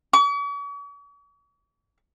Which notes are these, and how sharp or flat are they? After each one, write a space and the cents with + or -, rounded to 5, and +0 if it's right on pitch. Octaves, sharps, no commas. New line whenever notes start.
C#6 +45